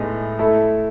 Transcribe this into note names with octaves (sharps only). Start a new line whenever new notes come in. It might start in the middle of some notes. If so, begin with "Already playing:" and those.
Already playing: A2 G#3 B3 D#4 A4
A3 E4 A4